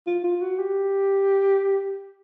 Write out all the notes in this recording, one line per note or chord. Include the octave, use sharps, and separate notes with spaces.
F4
F4
F#4
G4